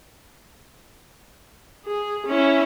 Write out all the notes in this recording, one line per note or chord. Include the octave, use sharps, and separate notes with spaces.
G#4
C#4 E4